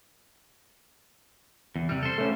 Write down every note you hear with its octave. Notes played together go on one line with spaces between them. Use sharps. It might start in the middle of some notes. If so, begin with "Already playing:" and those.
E2
C3 G3
A4 C5
A3 C#4